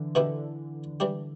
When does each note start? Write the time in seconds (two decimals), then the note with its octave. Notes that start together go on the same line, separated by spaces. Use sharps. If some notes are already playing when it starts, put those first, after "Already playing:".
Already playing: D3 E3
0.15 B2 D3 B3 E4 G4
1.00 E3 G3 D4 G4